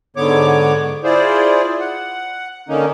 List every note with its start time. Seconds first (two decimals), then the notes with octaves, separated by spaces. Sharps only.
0.17 G#2 D3 B3 C#5 D6
1.04 E4 F4 G#4 C5 D5
1.80 F#5
2.68 D3 D#3 A#3 C#4 D#4